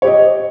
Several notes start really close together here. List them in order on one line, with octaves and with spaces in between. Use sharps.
C#5 G4 D#5